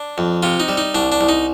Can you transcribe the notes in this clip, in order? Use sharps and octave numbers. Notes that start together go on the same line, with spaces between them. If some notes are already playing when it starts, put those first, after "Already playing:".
Already playing: D4
F2
C3 F4
D#4
G3
D#4
C2 D4
D4
C2
D#4